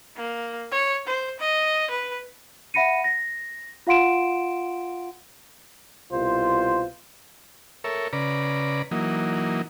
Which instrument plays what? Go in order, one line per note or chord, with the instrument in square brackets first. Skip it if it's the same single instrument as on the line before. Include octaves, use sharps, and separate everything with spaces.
[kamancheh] A#3
C#5
C5
D#5
B4
[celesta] E5 F#5 B5 A#6 C#7 D#7
A#6
F4 F5 F#5 C6 D7 E7
[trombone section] C2 B2 F4 C5
[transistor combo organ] A4 A#4 C#5 E5
C#3 B4 D5 A#5
E3 F#3 A#3 D#4